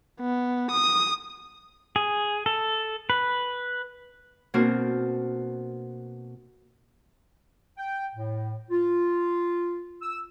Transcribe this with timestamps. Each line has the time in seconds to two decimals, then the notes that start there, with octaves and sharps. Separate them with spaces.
0.20 B3
0.71 D#6
1.96 G#4
2.46 A4
3.10 B4
4.54 B2 A#3 C4 D4 F#4 A#4
7.78 G5
8.15 A2
8.70 F4
10.02 E6